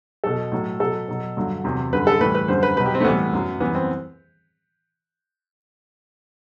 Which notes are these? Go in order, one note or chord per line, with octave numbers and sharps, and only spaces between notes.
B2 F#3 A4
A2 F#3
B2 F#3 A4
B2 F#3
G2 D3 F#3
E2 C3 F#3
F#2 D3 G3 B4
A4
A2 E3 G3 B4
B4
F#2 D3 G3 C5
B4
B2 F#3 B4
G4
C4
A3
A2 E3 G3 B3
F#2 F#3
F#2 E3 G3 B3
C4